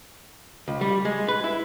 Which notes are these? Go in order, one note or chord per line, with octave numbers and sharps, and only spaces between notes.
C#2
G3
G#3
B4
E4